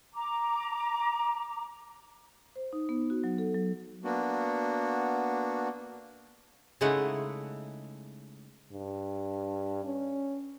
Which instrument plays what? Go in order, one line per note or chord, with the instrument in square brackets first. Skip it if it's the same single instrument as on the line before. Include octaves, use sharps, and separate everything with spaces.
[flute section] A#5 D6
[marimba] C5
D#4
B3
F#4
F#3
A4
F#3
[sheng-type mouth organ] A#3 B3 D4 F#4
[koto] C#3 G#3 A3 D#4 E4 F#5
[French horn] G2
C#4